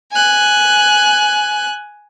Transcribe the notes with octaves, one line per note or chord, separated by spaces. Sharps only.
G#5 F#6